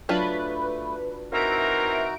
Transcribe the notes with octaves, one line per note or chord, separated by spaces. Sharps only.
F#3 A3 D4 F4 B4
E3 C4 D#4 F#4 A#4 E5 D7